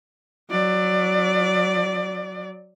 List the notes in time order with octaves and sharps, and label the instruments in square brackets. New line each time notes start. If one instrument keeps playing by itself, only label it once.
[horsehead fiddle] F#3 D5